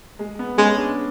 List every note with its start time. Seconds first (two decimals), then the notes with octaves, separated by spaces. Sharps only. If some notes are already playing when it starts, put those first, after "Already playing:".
0.19 G#3
0.39 B3
0.58 G#3 C#4
0.77 D4